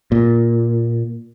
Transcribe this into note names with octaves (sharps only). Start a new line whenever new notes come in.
A#2